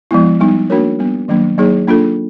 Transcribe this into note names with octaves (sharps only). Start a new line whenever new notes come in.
F3 G#3 B3 E4
G3 B3 D#4
A#3 D4 F#4 A#4 C#5
G3 B3 D4
D#3 F#3 A#3 D4
F#3 A#3 D#4 G#4 C#5
A#3 D4 F4 A4